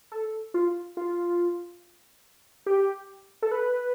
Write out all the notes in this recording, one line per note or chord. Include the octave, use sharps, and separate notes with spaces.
A4
F4
F4
G4
A4
B4